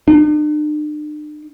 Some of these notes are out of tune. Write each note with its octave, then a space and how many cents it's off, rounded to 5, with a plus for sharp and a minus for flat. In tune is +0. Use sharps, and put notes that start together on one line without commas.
D4 +45